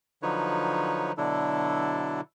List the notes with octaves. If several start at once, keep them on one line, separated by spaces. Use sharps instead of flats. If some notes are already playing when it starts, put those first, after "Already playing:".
D3 F3 F#3 D#4 B4 C#5
B2 D3 F#3 D4 E4 A4